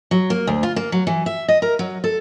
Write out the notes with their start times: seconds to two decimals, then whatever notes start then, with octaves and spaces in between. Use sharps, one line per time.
0.11 F#3
0.30 A#3
0.47 D2
0.63 F4
0.76 A#3
0.92 F#3
1.07 E3
1.26 E5
1.48 D#5
1.62 A#4
1.79 F#3
2.04 A4